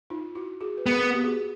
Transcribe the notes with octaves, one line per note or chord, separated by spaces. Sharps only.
D#4 F4
E4 F#4
F#4 G#4
B4
B3 G#4 A#4
G4
F#4 G#4